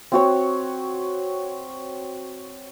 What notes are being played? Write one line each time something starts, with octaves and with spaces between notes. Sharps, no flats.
C4 F#4 C#5